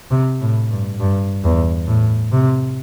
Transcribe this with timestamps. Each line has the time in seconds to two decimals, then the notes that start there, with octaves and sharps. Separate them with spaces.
0.11 C3
0.41 A2
0.71 G2
1.00 G2
1.44 E2
1.87 A2
2.32 C3